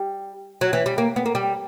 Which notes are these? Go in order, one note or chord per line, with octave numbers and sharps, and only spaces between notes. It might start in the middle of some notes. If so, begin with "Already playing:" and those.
Already playing: G3
F#3
E3
G3
A#3
B3
A#3
G3